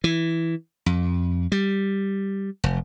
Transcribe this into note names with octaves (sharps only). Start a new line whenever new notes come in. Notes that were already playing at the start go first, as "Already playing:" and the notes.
E3
F2
G3
F1